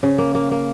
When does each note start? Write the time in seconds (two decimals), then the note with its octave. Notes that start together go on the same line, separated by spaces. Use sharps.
0.03 C#3
0.18 A#3
0.35 A#3
0.51 A#3